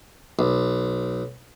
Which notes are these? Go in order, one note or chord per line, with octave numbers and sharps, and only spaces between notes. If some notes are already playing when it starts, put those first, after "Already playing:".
B1